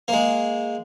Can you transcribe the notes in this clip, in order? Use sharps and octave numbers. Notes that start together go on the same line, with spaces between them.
G#3 A#3